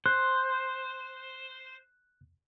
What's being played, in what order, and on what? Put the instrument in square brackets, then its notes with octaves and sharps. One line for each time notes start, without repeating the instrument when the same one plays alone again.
[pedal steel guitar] C5 [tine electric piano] F#6